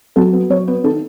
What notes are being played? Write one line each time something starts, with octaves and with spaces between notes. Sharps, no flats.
F#3 A4
B3
F#3 C#5
B3 B4
D#3 A4